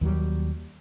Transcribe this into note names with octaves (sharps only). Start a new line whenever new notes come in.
D#2 F#3 G3